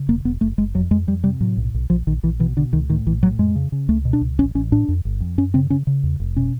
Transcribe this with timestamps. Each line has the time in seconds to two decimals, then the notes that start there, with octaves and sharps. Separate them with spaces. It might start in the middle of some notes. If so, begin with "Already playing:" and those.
Already playing: C#3
0.08 E1 A#3
0.25 E1 B3
0.41 F#1 A3
0.58 F#1 G#3
0.75 F2 F#3
0.91 F2 G#3
1.07 F2 G3
1.24 C3 G3
1.41 A2 F#3
1.57 B1
1.74 B1
1.90 A#1 F3
2.07 A#1 D#3
2.23 A#1 E3
2.39 B2 E3
2.57 B2 D3
2.73 C#2 D#3
2.90 A2 D#3
3.06 A#1 E3
3.23 A2 F#3
3.39 F2 G#3
3.55 C#3
3.72 C#3
3.88 C#2 A3
4.05 B2
4.13 D4
4.21 C#2
4.39 A1 C#4
4.55 A1 C#4
4.72 A2 D4
4.88 F2
5.05 G1
5.20 F2
5.38 F#2 C#4
5.54 C#3 C4
5.70 C#3 C#4
5.87 C#3
6.03 E2
6.20 F1
6.36 B2 C#4